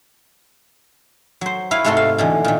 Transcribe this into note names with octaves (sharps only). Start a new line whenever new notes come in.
F#3 C5
E4 B4 C#5 F5
G#2 C3 A3 F#4 A4 C6
F5
B2 D3 E3
A#2 D#3